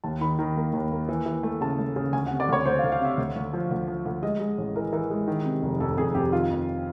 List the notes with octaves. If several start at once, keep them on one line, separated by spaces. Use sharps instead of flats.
D#2 A5
D#3 B5
D#3 A#5
A#3
D#2
A#3
E3
E3
A3
C#3 A5
A3
C#3
D2 G#5
F#5
C3
D5
D2 C#5
D2 C5
F5
D2
F5
C3 E5
D2
D2
F3
D2
F3
D2
G#3 D#5
G#3
A1
E3 A#4
E3 A#4
G#3
D#3
C3
F1
F2 A4
F2 G#4
F2 G4
D#3 F4
F2